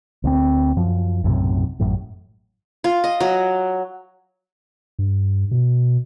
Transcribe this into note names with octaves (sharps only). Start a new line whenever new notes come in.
D2 A#3 C4
F#2 F3
B1 F#2 A2 C3
A1 F#2 A2
F4
D#5
F#3
G2
B2